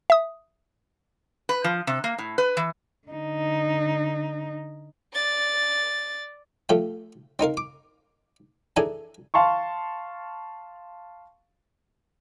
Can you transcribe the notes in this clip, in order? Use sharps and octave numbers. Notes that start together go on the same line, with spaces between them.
E5 D#6
B4
F3
C3
A#3
A2
B4
E3
D3 D#4
D5 A6
F3 A3 A4 G5
C4 D#4 A#4 F5
D6
E3 D4 G#4 A4 G#5 A#5
F5 A5 C6 C#6